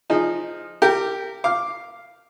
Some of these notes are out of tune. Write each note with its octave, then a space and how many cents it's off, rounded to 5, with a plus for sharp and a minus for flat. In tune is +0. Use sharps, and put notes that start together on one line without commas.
F3 +0 D#4 -15 G#4 +0
G4 +0 A#4 -25 G5 -5
F5 +0 D6 +0